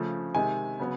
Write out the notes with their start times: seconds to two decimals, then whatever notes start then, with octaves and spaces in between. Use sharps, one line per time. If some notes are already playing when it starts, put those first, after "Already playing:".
Already playing: C#3 F3 A3
0.35 C3 D#3 G#3 G#5
0.80 C#3 F#3 B3